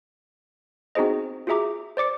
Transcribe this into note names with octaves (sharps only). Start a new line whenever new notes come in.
C4 D#4 F#4 G#4 C5 D#5
F4 F#4 G#4 E5 A#5 D6
C5 D5 D6 C#7